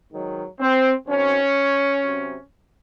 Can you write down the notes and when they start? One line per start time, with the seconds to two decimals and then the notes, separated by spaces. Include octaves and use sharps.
0.11 G#2 D#3 F#3
0.59 C4
1.06 F#2 D#3 F#3 C4 C#4
2.03 C3 F#3 C4